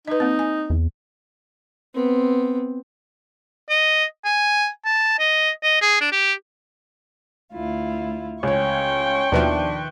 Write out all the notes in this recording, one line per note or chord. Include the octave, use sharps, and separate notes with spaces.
D#4 B4 D#5
A#3 C4
G#5
E2
B3 C4
D#5
G#5
A5
D#5
D#5
G#4
D4
G4
D2 E4 F4
C#2 C#4 C#5 G5 C6 C#6
D#2 B2 D#3 F3 D4 B4 E5